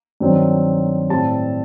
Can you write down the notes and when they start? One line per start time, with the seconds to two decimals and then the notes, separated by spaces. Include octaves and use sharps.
0.20 G2 D#3 F#3 C4
1.10 A2 G3 C4 A5